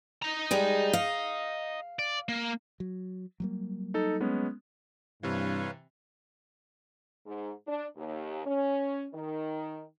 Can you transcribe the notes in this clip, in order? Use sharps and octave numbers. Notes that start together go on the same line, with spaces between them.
D#5 A#5
G3 G#3 G#4
F5
D5
A#3
F#3
F#3 G3 A#3
D#4 A4
G#3 B3 C#4
G2 C3 E3 B4 C#5 F5
G#2
D4
D#2
C#4
D#3